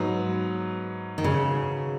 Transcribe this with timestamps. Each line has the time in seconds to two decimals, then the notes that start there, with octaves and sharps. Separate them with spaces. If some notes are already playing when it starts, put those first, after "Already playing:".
Already playing: G#2 F#3 B3
1.18 D#3
1.24 C#3